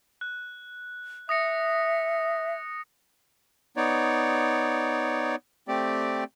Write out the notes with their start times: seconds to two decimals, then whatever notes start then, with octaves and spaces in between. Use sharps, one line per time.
0.21 F#6
1.29 E5 D#6 A#6 C#7
3.77 B3 D#4 C#5 D5
5.68 A3 C4 G4 D5